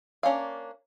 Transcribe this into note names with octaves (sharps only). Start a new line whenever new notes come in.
A#3 C#4 D4 F5